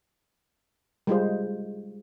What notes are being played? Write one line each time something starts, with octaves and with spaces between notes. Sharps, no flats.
G3 G#3 F4 C5